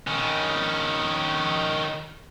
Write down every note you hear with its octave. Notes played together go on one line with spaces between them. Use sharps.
D#3 C#4